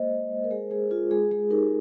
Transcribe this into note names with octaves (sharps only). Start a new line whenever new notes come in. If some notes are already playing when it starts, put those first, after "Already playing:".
Already playing: G#3 A#3 C5 D#5
G#3
G#3
A#4
G#3 G#4 C5
G#3 G#4
F4 G#4
G#3 G#4
G#3 G#4
D#4 G4 A#4